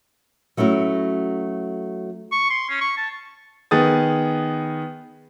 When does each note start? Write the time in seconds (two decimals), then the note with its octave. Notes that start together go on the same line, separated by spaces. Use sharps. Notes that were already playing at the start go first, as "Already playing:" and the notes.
0.57 F#3 A3 C#4 E4 F#4
2.32 C#6
2.50 C6
2.69 C#4
2.81 C#6
2.97 A5
3.71 D#3 B3 G#4 D#6 A6